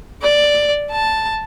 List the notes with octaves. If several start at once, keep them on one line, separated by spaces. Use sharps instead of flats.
D5
A5